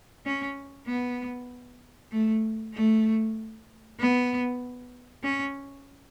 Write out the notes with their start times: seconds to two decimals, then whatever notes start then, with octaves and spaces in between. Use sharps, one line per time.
0.26 C#4
0.87 B3
2.11 A3
2.74 A3
3.99 B3
5.23 C#4